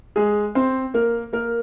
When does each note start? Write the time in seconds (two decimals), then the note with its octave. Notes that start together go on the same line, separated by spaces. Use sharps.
0.16 G#3 G#4
0.55 C4 C5
0.94 A#3 A#4
1.33 A#3 A#4